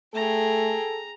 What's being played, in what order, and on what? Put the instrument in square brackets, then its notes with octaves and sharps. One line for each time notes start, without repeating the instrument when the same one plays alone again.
[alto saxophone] A3 [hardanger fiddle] G#4 G5 [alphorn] A4 [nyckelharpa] A#5